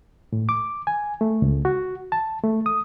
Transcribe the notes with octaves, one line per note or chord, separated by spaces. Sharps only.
A2
D6
G#5
A3
C#2
F#4
A5
A3
D#6